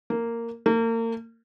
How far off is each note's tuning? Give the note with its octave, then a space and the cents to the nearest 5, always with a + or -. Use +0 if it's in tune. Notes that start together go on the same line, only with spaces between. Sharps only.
A#3 -10
A#3 -35